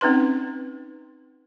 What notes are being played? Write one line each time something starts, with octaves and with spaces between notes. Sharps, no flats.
C4 C#4 D#4 B4 C6